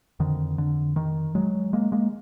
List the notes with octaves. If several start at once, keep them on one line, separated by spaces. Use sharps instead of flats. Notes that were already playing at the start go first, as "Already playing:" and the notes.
F2 D3 D#3
D3
D#3
F#3 G#3
G#3 A#3
G#3 A#3